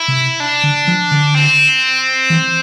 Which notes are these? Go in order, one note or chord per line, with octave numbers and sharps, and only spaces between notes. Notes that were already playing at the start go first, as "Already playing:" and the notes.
Already playing: E4
C3
D4
D3
F3
D3
C4
E3